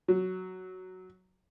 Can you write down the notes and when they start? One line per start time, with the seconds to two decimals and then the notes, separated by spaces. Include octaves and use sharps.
0.08 F#3